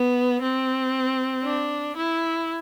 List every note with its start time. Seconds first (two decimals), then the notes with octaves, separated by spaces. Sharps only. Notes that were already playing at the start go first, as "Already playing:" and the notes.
Already playing: B3
0.41 C4
1.44 D4
1.96 E4